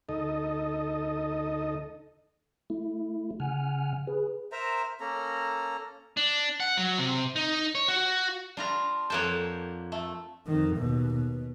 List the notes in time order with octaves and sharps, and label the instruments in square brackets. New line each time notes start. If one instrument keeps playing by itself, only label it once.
[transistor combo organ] D2 D#4 A4 D#5
[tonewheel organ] A3 E4
C#3 F#5 G#5 F6
G#4 B4
[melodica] A#4 C5 E5 A#5
A#3 C#4 A4 A#5
[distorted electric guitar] D4
F#5
F#3
C3
D#4
C#5
F#4
[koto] G3 F4 A#5 [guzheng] D4
[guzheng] F2 A#3 G5 [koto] C#5 F#5 A5
[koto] A3
[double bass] F2 D#3
D#2 B2
B2